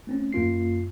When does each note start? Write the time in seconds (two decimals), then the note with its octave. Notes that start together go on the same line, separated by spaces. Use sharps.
0.07 A3 C4 C#4
0.33 F#2 A#3 F4 C7